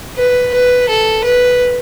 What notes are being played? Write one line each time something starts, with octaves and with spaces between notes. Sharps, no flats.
B4
B4
A4
B4